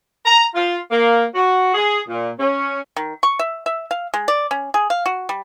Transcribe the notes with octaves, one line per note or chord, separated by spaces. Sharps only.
A#5
F4
A#3
F#4
G#4
A#2
C#4
D#3
C#6
E5
E5
F5
G#3
D5
C#4
G#4
F5
F#4
G3